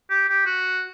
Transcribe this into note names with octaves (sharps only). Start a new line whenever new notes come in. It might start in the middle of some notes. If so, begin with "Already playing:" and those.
G4
G4
F#4